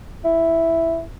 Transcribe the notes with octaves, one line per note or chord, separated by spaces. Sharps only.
E4